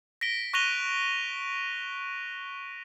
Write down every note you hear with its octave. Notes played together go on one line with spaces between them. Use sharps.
A#6 B6 D7 G7
C#6 F#6 A#6 D#7 F7 G7